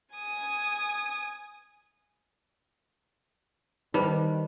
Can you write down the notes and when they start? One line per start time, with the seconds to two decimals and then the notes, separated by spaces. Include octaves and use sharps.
0.16 G#5 D#6
3.94 D#3 G3 D#4 B4 C5